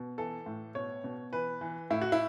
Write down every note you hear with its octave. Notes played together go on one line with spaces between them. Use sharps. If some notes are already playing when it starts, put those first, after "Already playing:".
Already playing: B2
E3 A4
A2
B2 C#5
B2
E3 B4
E3
A2 E4
F#4
E4